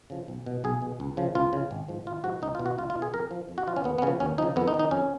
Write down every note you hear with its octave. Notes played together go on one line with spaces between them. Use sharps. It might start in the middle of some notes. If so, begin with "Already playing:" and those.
C#3 F3
B1
B2
B1 G#4
B2
C#2
C#3 F3
C#2 F4
C#3 F3
G#1
G#2 F3
G#1 F4
G#2 F3 F#4
C#2 D#4
F4
B2
F#4
C#2 F4
F4
B2
G#4
F2 A#4
F3
F2
F#4
F3 F4
C#4
D#2 B3
B3
C#3 F3 C#4
D#2 C#4
C#3 F3 D#4
F2 B3
D#4
D#3
D#4
F2 C#4